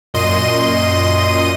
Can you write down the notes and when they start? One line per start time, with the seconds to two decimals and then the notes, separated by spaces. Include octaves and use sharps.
0.14 F#2 A#2 D#5 C6 D#7